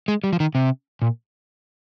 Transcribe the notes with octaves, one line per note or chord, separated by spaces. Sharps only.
G#3
G3
F3
D#3
C3
A#2